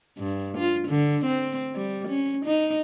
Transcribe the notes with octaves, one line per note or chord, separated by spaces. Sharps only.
G2
F4
D3
C4
G3
C#4
D#4